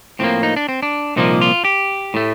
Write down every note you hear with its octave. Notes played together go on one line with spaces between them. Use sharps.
A2 F3 A#3 C4
D#4
D4
C4
D4
C2 A#2 F3 A#3 D#4
F4
G4
A2 A3